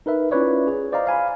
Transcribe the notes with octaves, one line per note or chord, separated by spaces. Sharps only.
D#4 A#4 B4 E5
C#4 E4 F4 B4 C#5 D5
G#4
C5 D5 D#5 F5 A#5
F5 G#5 B5